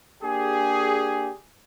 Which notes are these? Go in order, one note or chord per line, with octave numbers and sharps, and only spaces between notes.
A#3 D4 G4 G#4